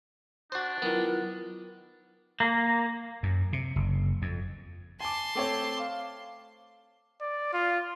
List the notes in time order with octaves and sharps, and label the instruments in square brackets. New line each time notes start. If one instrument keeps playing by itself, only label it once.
[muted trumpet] D4 [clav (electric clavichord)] F#4 C5
[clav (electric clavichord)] D#3 B3 [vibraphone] F#3 E4 F4 [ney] A#4
[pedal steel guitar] A#3
[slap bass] F#2
C3
F#1
F2
[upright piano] G#5 D6 [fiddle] A5 C6
[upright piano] A3 C4 C#5 [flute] D6
[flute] F5
[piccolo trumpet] D5
F4